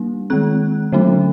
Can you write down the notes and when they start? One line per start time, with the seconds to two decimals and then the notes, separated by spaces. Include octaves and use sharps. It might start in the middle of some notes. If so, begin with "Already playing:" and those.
Already playing: G3 A#3 D4
0.30 D#3 G#3 C4 F#6
0.92 D3 F#3 A3 C#4